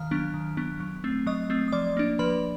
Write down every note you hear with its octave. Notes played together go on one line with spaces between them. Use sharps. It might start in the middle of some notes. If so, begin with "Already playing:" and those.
Already playing: D#3 F5 F6
F#3 B3 D4
D#3
F#3 B3 D4
F#3
A3 C4
F#3 D#5 D#6
A3 C4
D#6
F3 D5 D6
A#3 D4
F3 B4 B5